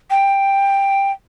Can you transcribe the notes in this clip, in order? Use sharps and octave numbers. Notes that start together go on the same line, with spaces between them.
G5